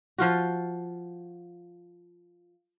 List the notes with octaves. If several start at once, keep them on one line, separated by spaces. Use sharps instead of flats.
F3 F4 F#4